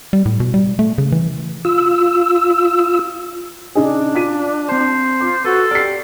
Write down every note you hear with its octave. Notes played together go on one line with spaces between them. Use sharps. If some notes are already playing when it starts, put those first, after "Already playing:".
G3
A2
B2
G3
A3
C#3
E3
F4 E6
C#3 D4 D#4 G#4
F4 B6 D#7
C4 C5 A5
F4 D6
F#4 A4 B4
G4 D5 F6 C7